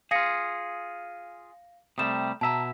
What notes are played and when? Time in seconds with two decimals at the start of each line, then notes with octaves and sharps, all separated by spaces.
0.11 F4 G#4 F5 A#6 C#7
1.98 C3 G3 A3 D#6 E7
2.41 B2 E5 A5 A#5